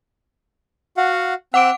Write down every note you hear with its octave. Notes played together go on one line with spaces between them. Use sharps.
F#4 F5 F#5
C4 F#5 D6 E6 F#6 D7